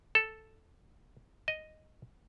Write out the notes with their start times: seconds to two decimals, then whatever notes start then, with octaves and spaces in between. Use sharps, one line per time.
0.15 A4
1.48 D#5